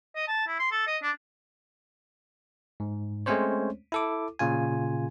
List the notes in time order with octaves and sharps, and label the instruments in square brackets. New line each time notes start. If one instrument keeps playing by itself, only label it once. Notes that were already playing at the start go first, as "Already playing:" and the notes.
[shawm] D#5
A5
E4
C6
A4
D#5
D4
[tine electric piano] G#2
G#3 A3 C4 C#4 C5 C#5
E4 A4 D6
A#2 C#3 F4 G#5